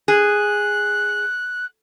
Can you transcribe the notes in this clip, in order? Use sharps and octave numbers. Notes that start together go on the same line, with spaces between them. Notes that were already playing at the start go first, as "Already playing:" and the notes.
G#4 F#6